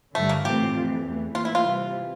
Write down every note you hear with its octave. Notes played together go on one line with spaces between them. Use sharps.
G2 D3 G3 A3
A#3
A2 E3 A3 C4 F4 G4
F2 E3 A3
E2 E3 A3
A2 E3 A#3 F4
E4
F4
C3 E3 G3